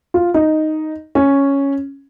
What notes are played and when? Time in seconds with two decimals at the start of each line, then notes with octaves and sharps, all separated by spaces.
0.14 F4
0.34 D#4
1.15 C#4